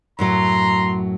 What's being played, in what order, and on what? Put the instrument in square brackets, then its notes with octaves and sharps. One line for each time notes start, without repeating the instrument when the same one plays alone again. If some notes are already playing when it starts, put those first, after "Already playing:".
[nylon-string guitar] F#2 A2 F#3 [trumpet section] A#5 C6